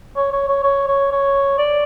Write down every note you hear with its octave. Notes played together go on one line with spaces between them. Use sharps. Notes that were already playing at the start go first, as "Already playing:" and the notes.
C#5
C#5
C#5
C#5
C#5
C#5
D5